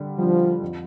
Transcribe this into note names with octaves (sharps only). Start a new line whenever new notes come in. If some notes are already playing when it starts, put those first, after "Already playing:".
Already playing: D3 G3
F3 G3 D4
F2